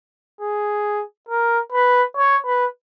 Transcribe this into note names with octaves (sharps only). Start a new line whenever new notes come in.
G#4
A#4
B4
C#5
B4